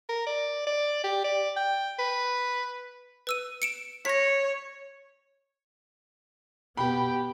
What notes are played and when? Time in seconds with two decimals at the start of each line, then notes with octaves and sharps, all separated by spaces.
0.09 A#4
0.27 D5
0.67 D5
1.04 G4
1.24 D5
1.56 G5
1.99 B4
3.27 B4 E6 D#7
3.62 C#7 D7 E7
4.05 C#5 A#6 B6
6.77 B2 B3 G4 G5 B5